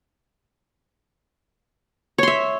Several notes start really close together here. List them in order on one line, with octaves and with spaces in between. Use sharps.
C#5 C6 E5